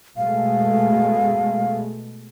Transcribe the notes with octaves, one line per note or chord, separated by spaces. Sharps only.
B2 G#3 A3 F5